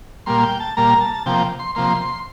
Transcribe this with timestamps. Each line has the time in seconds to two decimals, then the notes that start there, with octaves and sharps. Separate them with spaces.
0.26 A#2 G3 A#3 C6
0.43 G5
0.60 A5
0.77 A#2 G3 A#3 A#5
1.01 A5
1.26 C3 F3 A#3 G5
1.59 C6
1.75 C3 F3 A#3 C6